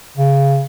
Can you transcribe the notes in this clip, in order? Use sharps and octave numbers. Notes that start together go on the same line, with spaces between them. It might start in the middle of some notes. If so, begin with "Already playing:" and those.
C#3